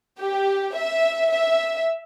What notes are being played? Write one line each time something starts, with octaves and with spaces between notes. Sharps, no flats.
G4
E5
E5